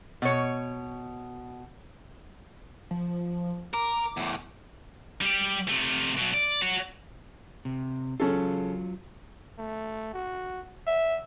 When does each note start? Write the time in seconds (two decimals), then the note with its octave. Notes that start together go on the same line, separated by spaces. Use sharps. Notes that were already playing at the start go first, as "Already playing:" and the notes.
0.22 B2 C#5
2.91 F3
3.74 A#4 D6
4.17 E2 A2
5.21 G3 G4
5.68 C3 A3
6.17 B2 F#3
6.34 D5
6.62 F#4 C#5
7.65 C3
8.20 C#3 F#3 C#4 F4 A4
9.58 A3
10.13 F#4
10.87 E5